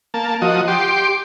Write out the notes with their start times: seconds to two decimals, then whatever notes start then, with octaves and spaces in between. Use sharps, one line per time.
0.14 A#3 A5
0.42 F3 F#4 D#5
0.68 G4 C6 D6